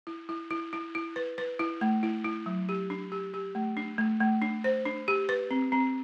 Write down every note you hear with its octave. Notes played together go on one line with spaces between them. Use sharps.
E4
E4
E4
E4
E4
B4
B4
E4
A3
E4
E4
F#3
G4
D4
G4
G4
A3
D4
A3
A3
D4
C5
D4
G4
B4
C4
C4